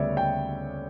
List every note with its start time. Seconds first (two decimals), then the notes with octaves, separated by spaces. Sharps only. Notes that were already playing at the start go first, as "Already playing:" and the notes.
Already playing: D2 C#3 G3 B3 C#5 D5 E5
0.17 G5